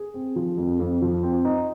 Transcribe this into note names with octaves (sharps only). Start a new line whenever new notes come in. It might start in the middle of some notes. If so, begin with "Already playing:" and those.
Already playing: G#4
C4
F3
F2
F2
F3
C4
D#4